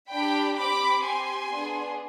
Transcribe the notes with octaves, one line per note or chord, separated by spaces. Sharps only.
D4 G4 G5 B5
C4 G4 B5 D6
C4 G4 G#5 C6
B3 D4 G#4